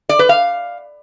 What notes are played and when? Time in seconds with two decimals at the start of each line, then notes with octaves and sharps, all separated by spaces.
0.09 D5
0.19 B4
0.29 F5